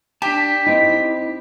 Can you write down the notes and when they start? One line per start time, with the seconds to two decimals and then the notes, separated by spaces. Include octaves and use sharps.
0.22 D4 G4 A5 B6
0.66 C4 D#4 E4